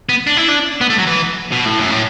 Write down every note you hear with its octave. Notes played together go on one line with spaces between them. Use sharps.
B3
D4
E4
D4
B3
A3
F#3
E3
B2
A2
F#2
A2